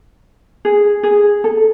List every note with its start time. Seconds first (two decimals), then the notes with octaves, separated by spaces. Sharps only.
0.65 G#4
1.03 G#4
1.44 A4